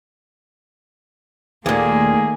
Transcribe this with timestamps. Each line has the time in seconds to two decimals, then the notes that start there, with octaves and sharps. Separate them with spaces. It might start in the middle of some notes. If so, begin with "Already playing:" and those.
1.66 D#2 A#2 D#3 A3 A#3 G#4